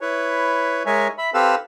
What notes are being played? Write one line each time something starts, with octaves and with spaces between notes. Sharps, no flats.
E4 B4 C#5
G#3 A#4 C#5 E5 G#5
E5 B5
C4 G4 A4 B4 F5 E6